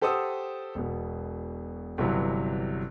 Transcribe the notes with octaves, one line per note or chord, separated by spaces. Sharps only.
G4 A4 C5 F#5 D#6 E6
E1 B2
G1 C3 E3 F#3